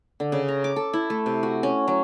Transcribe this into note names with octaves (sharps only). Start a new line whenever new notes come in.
D3
C#3
A#5
D6
A4
E4
A3
C3
F#4
C#4
F#3